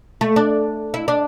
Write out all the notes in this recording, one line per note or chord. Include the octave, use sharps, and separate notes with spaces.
A3
D4
E4
D4